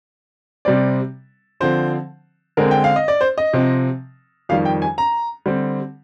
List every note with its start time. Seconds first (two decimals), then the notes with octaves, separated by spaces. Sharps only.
0.65 C3 G3 C4 D5
1.60 D3 F3 C4 C5
2.57 D3 G#3 C4 A#4
2.71 G5
2.84 F5
2.96 D#5
3.08 D5
3.21 C5
3.38 D#5
3.53 C3 F3 C4
4.49 F2 D#3 G3 F5
4.65 G5
4.82 G#5
4.98 A#5
5.46 D3 G3 C4